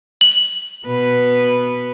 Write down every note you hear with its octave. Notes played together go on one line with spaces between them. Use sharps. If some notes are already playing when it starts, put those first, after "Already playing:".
F#7
B2 B3 B4